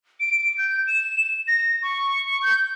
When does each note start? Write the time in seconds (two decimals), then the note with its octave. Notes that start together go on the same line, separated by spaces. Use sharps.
0.20 D7
0.58 G6
0.87 E7
1.48 A#6
1.83 C#6
2.43 G6